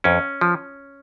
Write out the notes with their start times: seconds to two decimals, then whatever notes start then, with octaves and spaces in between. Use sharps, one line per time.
0.04 F2 C#4
0.41 F3